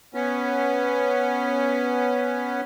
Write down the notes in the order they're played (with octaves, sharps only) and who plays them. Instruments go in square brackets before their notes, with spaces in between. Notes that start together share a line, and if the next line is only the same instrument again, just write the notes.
[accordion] B3 C#4